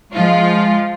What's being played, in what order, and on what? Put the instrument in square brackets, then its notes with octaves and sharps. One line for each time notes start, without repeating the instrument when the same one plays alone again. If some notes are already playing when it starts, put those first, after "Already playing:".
[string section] F3 F4 [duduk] G#3